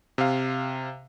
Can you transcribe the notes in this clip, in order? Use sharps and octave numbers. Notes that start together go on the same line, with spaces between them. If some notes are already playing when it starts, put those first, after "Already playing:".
C3 F5